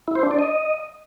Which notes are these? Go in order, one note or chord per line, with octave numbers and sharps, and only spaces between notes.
E4
C5
D4
D5
D#5